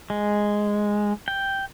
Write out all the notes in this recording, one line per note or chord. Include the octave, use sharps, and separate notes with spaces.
G#3
G5